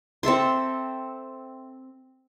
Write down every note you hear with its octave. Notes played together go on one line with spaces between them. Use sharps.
C4 A4 E5 C6